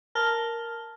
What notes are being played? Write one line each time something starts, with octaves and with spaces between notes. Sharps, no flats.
A#4 A5 F6 G7